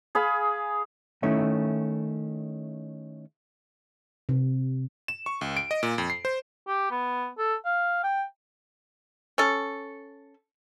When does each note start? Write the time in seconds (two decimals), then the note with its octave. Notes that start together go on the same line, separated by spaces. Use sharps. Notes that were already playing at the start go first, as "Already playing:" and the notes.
0.15 G#4 F5 B5
1.23 D#3 A3 C#4 E4
4.29 C3
5.08 E7
5.26 C#6
5.41 C#2
5.57 D7
5.71 D#5
5.83 A#2
5.98 F2
6.10 C7
6.25 C5
6.67 G4
6.91 B3
7.38 A4
7.65 F5
8.04 G5
9.38 C#4 A4